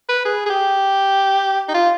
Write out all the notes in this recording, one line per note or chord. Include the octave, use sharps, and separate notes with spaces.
B4
G#4
G#4
G4
D#4
F4